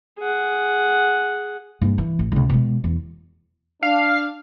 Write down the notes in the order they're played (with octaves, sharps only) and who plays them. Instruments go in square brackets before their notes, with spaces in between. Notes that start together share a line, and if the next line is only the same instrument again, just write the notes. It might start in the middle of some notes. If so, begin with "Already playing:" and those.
[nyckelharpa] G#4 F#5
[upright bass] G2 A#3
E3
A1
C#2 C3
B2 G#3
E2
[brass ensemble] D4 [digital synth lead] F5